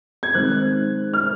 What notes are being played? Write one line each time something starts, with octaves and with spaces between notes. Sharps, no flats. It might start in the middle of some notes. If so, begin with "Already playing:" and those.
G#6
D#3 G#3 C4 F#6
F6